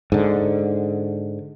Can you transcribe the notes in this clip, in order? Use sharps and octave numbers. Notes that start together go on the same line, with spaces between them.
G#2 D3